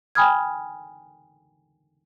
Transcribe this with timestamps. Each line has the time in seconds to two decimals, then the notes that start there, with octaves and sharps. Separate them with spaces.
0.15 G5 G#5 B5 D#6 F6 G#6